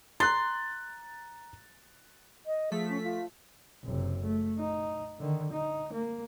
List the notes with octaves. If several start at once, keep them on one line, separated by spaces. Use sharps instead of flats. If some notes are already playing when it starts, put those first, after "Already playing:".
A#5 C6 F#6 A6
D#5
F3 A3 G#4 B6
C#4
F4
F#1 C3
A3
D#4
D3 D#3
D#4
A#3